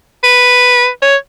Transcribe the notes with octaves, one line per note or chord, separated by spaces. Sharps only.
B4
C#5